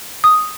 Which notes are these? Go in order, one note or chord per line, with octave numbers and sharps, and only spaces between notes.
D#6